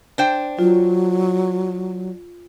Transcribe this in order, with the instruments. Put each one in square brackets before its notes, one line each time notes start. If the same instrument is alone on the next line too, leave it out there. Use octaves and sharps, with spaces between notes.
[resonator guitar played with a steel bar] D4 C5 G5
[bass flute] F#3 [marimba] F4